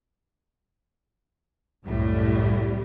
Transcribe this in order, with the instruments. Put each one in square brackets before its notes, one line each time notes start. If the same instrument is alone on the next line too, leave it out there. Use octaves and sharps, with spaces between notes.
[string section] C2 F#2 A2 G3